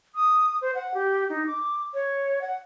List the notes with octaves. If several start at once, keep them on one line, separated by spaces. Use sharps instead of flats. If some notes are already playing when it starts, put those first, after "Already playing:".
D#6
C5
F#5
G4
D#4
D6
C#5
F#5